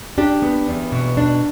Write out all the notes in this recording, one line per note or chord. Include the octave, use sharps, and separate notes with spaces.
D4 G4
B3
E2
B2
D4